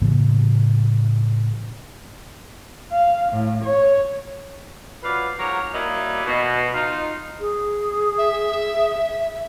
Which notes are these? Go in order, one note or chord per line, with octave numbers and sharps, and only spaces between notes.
A2 C#3 E3 A#3
F5
A2
C#5
F3 F#3 B4 D5 F5
G#2 F3 F#3 G4 A#4 C#5
F#3 G3 A#3 D#4 E4
B2
D#4 F4
G#4
E5